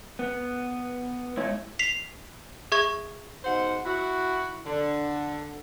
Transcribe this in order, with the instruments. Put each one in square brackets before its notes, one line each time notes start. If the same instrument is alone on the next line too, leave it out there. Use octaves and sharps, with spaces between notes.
[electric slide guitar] B3
G#3 E4 C#5
[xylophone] B6 C7 F7
G#4 E5 C#6 G#6
[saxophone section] G#2 B2 C5 F#5
E4 F#4
D3